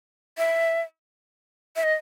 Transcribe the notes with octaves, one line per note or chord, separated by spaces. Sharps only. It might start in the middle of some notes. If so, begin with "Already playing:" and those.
E5
E5
D#5